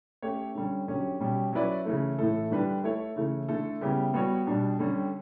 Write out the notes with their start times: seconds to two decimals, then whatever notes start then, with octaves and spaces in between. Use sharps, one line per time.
0.22 A3 C#4 G4 C#5
0.55 D3 G3 C#4
0.88 D3 F#3 C#4 G4 C#5
1.20 B2 G3 C#4 G4
1.53 F#3 C#4 E4 B4 D5
1.85 C#3 E3 A3
2.18 A2 E3 A3 E4 A4
2.51 D3 G3 D4 G4 B4
2.83 A3 E4 A4 C#5
3.16 C#3 E3 A3
3.48 D3 A3 E4 A4
3.81 C#3 G3 B3 E4 G4
4.14 G3 B3 F#4 C#5
4.46 B2 G3 D4 G4
4.79 D3 G3 C#4 G4